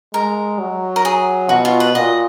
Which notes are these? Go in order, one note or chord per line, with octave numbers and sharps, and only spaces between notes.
G#3 A#4
F#3
A#4
G#4
B2 F#4
F4
B4
A#2 D#5